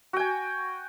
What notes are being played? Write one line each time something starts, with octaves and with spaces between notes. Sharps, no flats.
F#4 G5 G#5